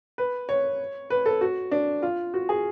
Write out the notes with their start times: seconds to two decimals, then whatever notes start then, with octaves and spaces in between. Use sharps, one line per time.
0.18 B4
0.49 C#5
1.10 B4
1.26 A4
1.41 F#4
1.71 D4
2.02 F4
2.34 F#4
2.49 G#4